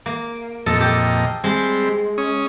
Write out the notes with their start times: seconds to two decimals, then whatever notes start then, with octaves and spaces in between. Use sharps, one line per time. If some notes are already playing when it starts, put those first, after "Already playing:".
0.06 A#3
0.66 F2 A#2 A4 D#5
0.80 G4 A4
1.44 G3 G#3 C4
2.18 C#4 D#6